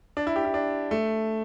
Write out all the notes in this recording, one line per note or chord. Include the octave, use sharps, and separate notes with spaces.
D4
E4
G4
E4
D4
A3